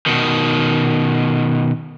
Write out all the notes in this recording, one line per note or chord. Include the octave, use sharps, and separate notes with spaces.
B2 D#3